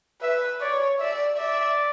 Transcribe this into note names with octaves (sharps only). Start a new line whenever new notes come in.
B4 E5
C#5 D5
D5 E5
D5 E5